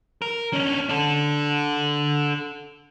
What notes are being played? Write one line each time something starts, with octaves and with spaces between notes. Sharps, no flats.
A#4
C#4 D4
D4 A4